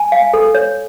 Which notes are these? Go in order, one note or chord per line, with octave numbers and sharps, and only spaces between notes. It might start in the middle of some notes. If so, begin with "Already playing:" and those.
Already playing: G#5
F5
A4
C#5